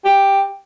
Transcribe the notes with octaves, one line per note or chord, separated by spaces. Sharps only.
G4